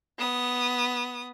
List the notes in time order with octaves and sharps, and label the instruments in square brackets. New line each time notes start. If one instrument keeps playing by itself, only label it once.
[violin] B3 D#6